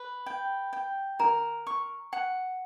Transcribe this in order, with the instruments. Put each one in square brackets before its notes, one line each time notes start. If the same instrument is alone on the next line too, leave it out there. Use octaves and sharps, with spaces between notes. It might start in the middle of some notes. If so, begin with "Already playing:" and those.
Already playing: [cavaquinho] B4
G5
G5
[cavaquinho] A#4 [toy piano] A#5
[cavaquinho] C#6
F#5